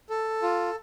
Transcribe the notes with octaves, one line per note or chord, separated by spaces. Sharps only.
A4
F4